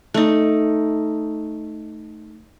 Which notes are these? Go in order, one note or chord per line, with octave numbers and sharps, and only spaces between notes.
A3 D#4